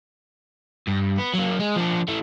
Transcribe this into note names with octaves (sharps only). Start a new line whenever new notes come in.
G2
B3
F#3 A#3
G#3
F3 D4
E3 A3